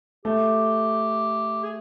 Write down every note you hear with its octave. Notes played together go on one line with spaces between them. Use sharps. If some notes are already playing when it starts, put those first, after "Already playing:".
A3 G4
G#4